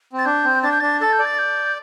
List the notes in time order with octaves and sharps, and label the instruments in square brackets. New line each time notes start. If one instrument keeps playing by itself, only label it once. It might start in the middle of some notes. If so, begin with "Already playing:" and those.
[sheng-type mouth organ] C4
[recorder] A6
[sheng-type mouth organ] D4 [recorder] G6
[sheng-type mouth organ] C4
[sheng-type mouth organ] D4 [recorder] A6
[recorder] G6
[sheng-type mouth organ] D4 [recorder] A6
[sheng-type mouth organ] A4 [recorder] A6
[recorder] G6
[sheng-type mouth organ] D5
[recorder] A6
G6